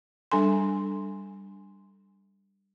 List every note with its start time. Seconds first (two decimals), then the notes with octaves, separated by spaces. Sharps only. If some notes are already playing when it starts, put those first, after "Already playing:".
0.32 G3 D4 A4 G#5 C6